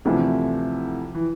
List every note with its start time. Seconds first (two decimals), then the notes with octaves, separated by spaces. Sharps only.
0.05 D2 C3 E3 F3 A3 E4
1.14 E3